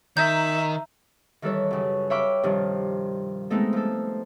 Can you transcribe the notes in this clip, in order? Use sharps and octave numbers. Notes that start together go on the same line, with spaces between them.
D#3 E5 A#5 G6
D#3 E3 G3 A4 B4 C#5
F#2 C#3
C#5 E5 F5 G5 B5 D6
G2 C3 D#3 F3 G3
G#3 A3 B3 C4 D#4 A4
F3 A4